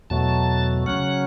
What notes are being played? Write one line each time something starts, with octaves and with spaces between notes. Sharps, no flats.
E2 B2 F#3 A3 A5
C#3 F#3 C#4 F#5